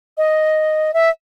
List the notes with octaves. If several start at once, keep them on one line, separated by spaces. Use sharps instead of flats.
D#5
E5